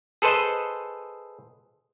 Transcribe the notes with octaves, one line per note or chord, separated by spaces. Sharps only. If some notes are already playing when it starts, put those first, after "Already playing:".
G#4 A4 B4 C5 D#5